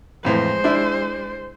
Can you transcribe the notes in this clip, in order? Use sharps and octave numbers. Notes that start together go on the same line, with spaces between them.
F2 A2 E3 G#3 C5
D4 E4